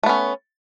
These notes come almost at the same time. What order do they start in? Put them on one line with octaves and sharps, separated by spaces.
A3 B3 C#4